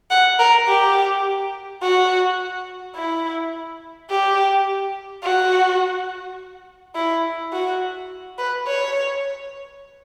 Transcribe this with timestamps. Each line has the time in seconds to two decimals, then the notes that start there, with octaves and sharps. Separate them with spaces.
0.10 F#5
0.39 A#4
0.68 G4
1.82 F#4
2.96 E4
4.10 G4
5.23 F#4
6.95 E4
7.53 F#4
8.38 B4
8.67 C#5